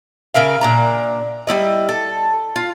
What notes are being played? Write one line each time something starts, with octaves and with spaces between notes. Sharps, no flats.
C#3 A#4 E5 F5
A#2 D4 A#5
G3 B3 E4 D#5
A4
F4